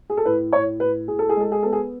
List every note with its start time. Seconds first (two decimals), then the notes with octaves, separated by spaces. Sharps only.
0.10 G#4
0.17 A4
0.25 A2 B4
0.53 A2 C#5
0.80 A2 B4
1.08 A2 G#4
1.19 A4
1.29 G#4
1.36 G#3 A4
1.52 G#4
1.63 B3 A4
1.73 G#4